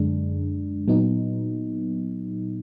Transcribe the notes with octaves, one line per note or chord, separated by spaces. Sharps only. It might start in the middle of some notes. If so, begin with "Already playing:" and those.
Already playing: F#2 D3 G#3 D4
A#2 F#3 B3 D#4